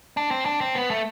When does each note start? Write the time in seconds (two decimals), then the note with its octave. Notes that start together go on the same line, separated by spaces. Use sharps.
0.17 D4
0.31 C4
0.46 D4
0.61 C4
0.75 B3
0.91 A3